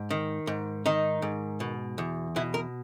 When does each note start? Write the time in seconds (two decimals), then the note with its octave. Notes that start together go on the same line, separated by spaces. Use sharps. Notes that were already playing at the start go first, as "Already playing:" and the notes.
Already playing: G#2
0.11 D#3
0.47 G#2
0.86 D#3 D#4
1.22 G#2
1.60 B2
1.98 E2
2.36 B2 E4
2.54 A#4